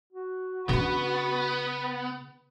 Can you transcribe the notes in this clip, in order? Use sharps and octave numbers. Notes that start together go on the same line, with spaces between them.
F#4
C#3 B3 D4 B4